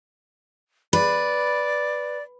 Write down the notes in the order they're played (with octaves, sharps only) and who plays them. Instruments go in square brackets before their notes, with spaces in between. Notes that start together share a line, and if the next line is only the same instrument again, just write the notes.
[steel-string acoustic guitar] B4 [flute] D5